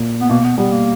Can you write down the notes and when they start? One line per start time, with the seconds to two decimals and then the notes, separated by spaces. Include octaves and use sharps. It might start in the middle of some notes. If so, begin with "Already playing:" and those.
Already playing: A#2
0.21 B3
0.29 B2 A#3
0.44 B3
0.58 G3 B3
0.71 A#3